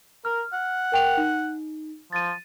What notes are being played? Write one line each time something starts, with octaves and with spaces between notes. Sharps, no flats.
A#4 F6
F#5
A#4 G5 F7
D#4
F3 A6 D#7